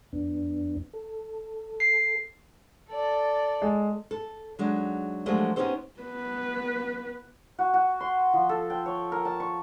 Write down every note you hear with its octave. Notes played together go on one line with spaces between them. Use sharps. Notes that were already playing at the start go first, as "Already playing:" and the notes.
F2 B3 D4
A4
C7
A4 D5
G#3
A4
F#3 G#3 D4 D#4
F3 F#3 G#3 A3 D4 G4
B3 C#4 D#4 G4 A4 C5
B3 B4
F#4
F#4
C6
F3
A4
G5
C#5
A#4
A5
C#6